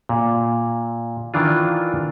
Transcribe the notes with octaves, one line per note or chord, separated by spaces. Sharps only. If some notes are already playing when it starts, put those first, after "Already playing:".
A#2
D#3 E3 D4 F4